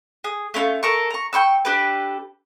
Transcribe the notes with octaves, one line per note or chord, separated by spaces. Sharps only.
G#4
A3 C#4 E4 F4
A4 A#4 C#6
A#5 C#6
G5 C6 C#6 E6
D4 G4 A4 B4